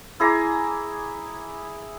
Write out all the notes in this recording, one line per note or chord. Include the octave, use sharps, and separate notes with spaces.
E4 G#4 A#5 D6